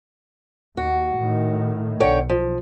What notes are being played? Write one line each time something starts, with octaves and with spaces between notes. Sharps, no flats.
D#2 F#4
A2 D#3
B1 D3 C#5 G5
F3